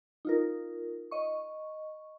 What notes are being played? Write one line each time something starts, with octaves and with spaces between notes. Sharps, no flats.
D#4 F4 A#4
D#5 C#6